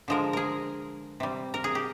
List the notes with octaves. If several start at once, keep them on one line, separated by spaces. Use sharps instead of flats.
D3 F3 G#3 A#4
G#4 A#4
C3 G3
A#4
G#4
G4